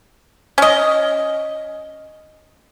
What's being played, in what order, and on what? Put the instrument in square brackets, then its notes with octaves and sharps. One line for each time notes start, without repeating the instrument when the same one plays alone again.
[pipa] C#4 D#5